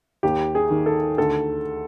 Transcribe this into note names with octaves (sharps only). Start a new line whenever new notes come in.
D#2 G4
G#4
D#3
A4
D2 A4